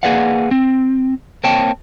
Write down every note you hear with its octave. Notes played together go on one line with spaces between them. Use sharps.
A#3 G#4 B4 D5 F5 F#5
C4
A#3 C4 C#5 G5 A5